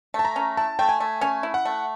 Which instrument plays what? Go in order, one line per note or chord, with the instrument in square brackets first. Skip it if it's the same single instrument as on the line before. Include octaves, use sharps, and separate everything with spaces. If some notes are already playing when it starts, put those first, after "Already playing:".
[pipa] A3 [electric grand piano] A5
[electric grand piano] A#5
[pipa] C#4
[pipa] E4 [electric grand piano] A5
[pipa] A3 [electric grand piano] G5
[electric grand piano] G#5
[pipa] A3
[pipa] C#4 [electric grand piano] G#5
[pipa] E4
[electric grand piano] F#5
[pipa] A3